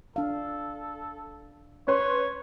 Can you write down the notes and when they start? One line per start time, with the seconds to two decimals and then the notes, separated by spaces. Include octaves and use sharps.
0.16 D4 A4 F5
1.87 C#4 B4 C#5 C6